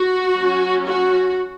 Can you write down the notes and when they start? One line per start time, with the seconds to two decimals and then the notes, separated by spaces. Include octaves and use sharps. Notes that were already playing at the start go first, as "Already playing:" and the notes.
Already playing: F#4
0.35 F#3 C#4
0.86 F#4